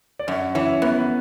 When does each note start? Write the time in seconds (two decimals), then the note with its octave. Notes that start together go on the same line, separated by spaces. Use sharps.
0.19 D5
0.27 F#2 C#4 C#5
0.55 E3 C#4 C#5
0.71 C#5
0.82 F#2 B3 B4
0.98 B4